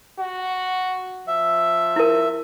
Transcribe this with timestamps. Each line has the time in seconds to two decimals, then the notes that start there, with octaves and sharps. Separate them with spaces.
0.20 F#4
1.27 F3 E5
1.96 E4 A#4